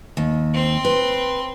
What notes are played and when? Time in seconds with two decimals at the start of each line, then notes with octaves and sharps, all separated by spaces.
0.17 D#2
0.54 C4 C6
0.85 B4